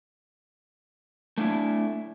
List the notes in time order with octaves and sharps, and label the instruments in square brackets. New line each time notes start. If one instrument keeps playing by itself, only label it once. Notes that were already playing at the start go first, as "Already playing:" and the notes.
[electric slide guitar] A3 D4 E4